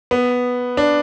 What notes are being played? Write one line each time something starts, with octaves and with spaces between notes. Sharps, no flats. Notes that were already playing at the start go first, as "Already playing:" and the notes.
B3
D4